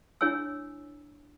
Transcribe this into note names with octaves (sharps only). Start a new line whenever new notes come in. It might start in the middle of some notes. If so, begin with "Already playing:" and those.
D4 E4 C#5 G#5 E6